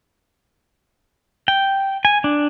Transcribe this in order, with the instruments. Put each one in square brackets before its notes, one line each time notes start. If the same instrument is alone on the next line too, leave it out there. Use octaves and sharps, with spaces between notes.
[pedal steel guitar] G5
G#5
D4